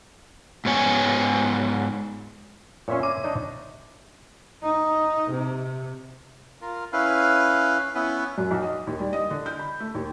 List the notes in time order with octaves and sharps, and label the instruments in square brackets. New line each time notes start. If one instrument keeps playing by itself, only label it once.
[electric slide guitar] G#2 B3 C#5 G#5
[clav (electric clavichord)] A#2 C#4 [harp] C#5 E5 C6
[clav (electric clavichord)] A#5 [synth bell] D6
[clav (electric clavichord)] D4 D#4 D#5
[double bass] D#4
C3
[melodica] F4 A#4
C#4 E4 B4 F5
B3 C#4 E4 B4
[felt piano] F#2
B1
D#5
D#2
G3
D#5
D3
G6
B5
A3
D#2